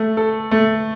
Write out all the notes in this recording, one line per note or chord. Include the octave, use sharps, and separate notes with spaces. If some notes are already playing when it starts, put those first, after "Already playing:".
Already playing: A3
A4
A3